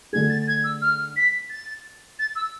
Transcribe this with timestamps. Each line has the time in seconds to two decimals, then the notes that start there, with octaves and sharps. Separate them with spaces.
0.13 D3 A3 D4 G#4 G#6
0.30 A6
0.48 G#6
0.64 E6
0.82 F6
1.16 B6
1.50 A6
2.19 A6
2.36 E6